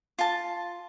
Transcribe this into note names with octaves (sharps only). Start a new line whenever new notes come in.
F4 A5